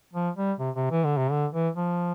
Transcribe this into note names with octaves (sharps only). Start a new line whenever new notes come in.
F3
G3
C3
C3
E3
D3
C3
D3
E3
F3